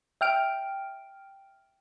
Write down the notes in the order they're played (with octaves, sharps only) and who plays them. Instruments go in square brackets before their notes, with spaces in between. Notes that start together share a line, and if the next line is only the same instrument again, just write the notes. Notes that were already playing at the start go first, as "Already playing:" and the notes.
[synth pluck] E5 G5 F6 D7